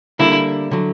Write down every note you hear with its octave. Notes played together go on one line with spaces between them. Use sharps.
D3 G3 A#3 D4 E4
D3 F#3